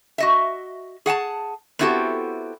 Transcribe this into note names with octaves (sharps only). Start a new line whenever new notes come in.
F#4 D#5 E5
G#4 F#5 G#5 A5
B3 C4 E4 F#4 G4 A4